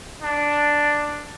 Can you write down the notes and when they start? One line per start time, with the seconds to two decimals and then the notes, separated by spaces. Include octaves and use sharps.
0.22 D4